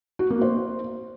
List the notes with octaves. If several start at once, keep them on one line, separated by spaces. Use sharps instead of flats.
F#4
A#3
C5